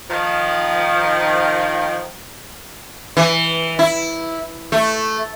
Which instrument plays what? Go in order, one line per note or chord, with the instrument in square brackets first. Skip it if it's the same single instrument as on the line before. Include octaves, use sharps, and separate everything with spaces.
[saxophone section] D#3 F3
[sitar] E3
E4
A3